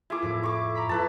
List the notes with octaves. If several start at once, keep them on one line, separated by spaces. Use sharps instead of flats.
E4 F4 G#4 D6
F2 A2
C#6 D6
A#5 B5 B6
F2 E4 B4 A5